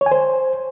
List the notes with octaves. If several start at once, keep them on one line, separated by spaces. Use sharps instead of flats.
C#5
G#5
C5